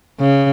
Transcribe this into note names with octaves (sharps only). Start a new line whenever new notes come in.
C#3